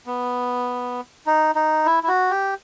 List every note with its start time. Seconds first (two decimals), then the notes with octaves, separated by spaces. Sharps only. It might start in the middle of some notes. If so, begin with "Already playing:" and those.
0.06 B3
1.26 D#4
1.55 D#4
1.86 E4
2.03 E4
2.08 F#4
2.31 G4